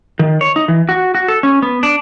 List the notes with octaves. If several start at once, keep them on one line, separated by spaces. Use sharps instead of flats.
D#3
C#5
D#4
E3
F#4
F#4
A4
C#4
B3
D4